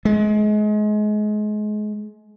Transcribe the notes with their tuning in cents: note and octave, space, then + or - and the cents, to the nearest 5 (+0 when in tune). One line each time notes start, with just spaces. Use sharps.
G#3 +30